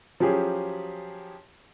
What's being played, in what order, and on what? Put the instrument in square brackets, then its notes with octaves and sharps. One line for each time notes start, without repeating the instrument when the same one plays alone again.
[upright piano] F3 F#3 C#4 G4 G#4